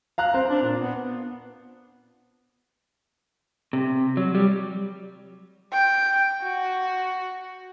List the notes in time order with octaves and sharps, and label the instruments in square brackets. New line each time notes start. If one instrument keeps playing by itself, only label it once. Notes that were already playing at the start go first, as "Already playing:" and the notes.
[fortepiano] F5 A#5 F#6
C4 C5
[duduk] D4
A#2
B3
[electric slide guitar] C3
F#3
G3
[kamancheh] G5
F#4